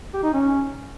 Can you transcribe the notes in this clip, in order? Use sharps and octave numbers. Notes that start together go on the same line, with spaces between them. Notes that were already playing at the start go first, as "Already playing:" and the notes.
G4
D#4
C#4